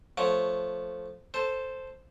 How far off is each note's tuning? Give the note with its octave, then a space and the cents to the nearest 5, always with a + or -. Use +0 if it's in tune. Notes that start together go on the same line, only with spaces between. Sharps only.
F3 +0 A3 +0 C#5 +0
A4 +0 C5 +0